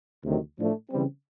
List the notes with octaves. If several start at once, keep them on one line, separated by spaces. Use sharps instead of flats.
D2 C3 D#3 F#3
A2 F3 A3 D4
C#3 E3 G3 C4